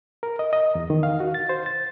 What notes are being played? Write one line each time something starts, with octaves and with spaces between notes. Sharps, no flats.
A#4
D#5
D#5
E2
D#3
F5
F#4
A6
C5
A6